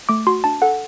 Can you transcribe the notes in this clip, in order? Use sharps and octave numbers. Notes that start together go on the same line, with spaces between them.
A3 D6
F#4 C6
D4 A5
A4 F#5